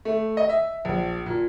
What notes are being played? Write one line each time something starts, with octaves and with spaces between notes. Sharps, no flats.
A3
D#5
E5
A#1
A#2